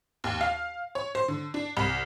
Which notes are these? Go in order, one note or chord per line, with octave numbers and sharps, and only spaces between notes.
D#2
F5
C#5
C5
D3
D4
C2